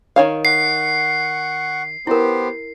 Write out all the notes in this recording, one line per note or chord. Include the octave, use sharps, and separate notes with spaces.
D#3 C#5 F5
F#5 C#6 C7
B3 E4 G4 A#4 C5